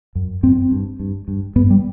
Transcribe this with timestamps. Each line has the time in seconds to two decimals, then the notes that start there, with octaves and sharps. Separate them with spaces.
0.15 F#2
0.43 F#2 C4
0.71 G2
1.00 G2
1.28 G2
1.56 G2 B3
1.70 G3